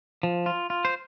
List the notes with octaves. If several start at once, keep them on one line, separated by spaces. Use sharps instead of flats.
F3
F4
F4
C5